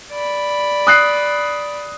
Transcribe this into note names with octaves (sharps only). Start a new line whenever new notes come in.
D5 B5
D#6 F#6 C7